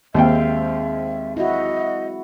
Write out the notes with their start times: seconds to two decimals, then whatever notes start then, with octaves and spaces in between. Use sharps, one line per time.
0.14 D#2 G#3 C4 E5 F5 G5
1.37 E4 F#4 D#5